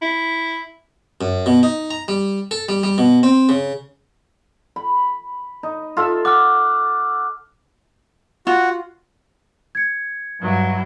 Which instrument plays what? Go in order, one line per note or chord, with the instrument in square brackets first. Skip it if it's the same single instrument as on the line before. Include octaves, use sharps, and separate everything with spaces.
[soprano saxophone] E4
[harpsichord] F#2
B2
D#4
A#5
G3
A4
G3
G3
B2
C4
C#3
[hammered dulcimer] B5
D#4
F4 A4 E5
[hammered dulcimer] F#5 [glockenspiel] D6 F6
[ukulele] F4 [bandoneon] F#4
[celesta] G#6 C#7
[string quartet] G2 F#3 E4